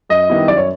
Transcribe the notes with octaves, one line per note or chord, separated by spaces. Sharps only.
F#2 D#5
D#3 G3 B3 E4
F#2 D5
C#5